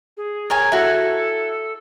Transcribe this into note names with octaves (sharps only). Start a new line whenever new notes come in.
G#4
A#4 C#5 G#5
E4 F#4 A4